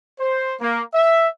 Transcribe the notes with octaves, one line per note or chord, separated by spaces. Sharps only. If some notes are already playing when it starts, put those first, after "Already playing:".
C5
A#3
E5